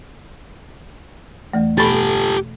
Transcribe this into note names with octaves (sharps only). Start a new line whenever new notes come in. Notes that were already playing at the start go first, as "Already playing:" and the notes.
E2 E3 A3
B2 G4 A4 B5 A6